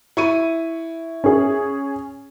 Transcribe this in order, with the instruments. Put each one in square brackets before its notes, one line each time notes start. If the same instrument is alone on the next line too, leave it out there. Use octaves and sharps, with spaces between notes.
[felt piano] E4 C#6 D#7
[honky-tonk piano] C#4 G#4